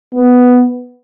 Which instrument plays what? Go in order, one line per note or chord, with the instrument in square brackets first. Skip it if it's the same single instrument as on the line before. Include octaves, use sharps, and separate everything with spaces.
[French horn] B3